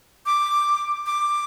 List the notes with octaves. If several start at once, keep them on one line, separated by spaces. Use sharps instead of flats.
D6
D6